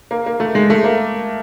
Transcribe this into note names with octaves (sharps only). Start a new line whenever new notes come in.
A#3
A#3
A3
G#3
A3
A#3